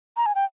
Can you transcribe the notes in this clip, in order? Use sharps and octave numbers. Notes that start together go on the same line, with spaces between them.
A#5
G#5
G5